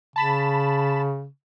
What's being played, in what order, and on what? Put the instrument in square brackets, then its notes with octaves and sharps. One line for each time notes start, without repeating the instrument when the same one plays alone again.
[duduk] C#3 [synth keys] A5 B5 E7